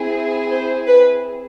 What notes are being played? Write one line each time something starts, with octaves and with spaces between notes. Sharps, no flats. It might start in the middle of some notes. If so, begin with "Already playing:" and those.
Already playing: C4 E4 G#4
C5
B4